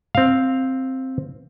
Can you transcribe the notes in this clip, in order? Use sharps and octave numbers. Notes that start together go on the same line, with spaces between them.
C4 F5